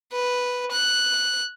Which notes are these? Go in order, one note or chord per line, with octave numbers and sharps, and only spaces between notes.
B4
F#6